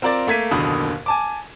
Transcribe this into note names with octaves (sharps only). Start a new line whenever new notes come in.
C4 F4 A#4 D5 D6 A6
A3 A#3 G#6 B6 D#7
F#1 D#2 B2 D3 B5 D#6
G#5 A5 D6